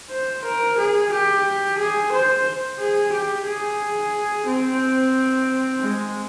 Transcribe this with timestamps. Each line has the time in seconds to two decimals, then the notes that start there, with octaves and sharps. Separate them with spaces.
0.11 C5
0.44 A#4
0.78 G#4
1.12 G4
1.78 G#4
2.12 C5
2.79 G#4
3.12 G4
3.45 G#4
4.46 C4
5.80 G#3